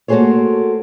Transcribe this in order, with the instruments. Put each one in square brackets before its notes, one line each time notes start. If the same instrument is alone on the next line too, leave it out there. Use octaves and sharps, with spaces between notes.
[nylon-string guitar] A3 A#3 F#4 G#4 C5 C#5